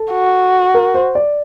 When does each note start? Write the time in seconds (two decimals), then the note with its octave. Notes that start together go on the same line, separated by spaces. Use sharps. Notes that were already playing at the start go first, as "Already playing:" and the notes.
Already playing: A4
0.12 F#4
0.74 A#4
0.95 C5
1.15 D5